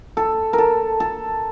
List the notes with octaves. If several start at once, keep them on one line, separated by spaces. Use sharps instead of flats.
A4
A#4
A4
A4